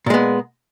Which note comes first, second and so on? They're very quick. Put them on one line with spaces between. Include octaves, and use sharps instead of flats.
A#2 G#3 B3